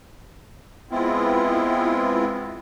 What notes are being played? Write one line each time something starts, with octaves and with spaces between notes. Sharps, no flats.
G#3 B3 C4 E4 F4